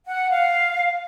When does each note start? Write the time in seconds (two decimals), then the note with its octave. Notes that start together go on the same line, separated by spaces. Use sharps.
0.06 F#5
0.30 F5